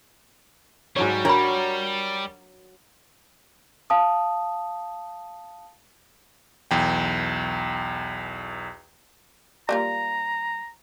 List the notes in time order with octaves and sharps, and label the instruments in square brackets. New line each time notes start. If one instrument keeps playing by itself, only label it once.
[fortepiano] G#2 F#3 C#5 [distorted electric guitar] G3
[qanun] F#3 [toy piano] D4 B5 [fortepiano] A#4 C#5 A#5
[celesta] F5 A5 D#6
[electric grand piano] B1 E2 G5
[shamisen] G3 A#3 F4 [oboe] A#5